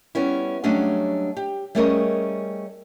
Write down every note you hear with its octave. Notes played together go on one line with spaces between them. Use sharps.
G3 B3 C#4 E4
F#3 G3 A3 C#4 D4 D#5
G4
G3 A3 C#4 G#4 A#4 D#5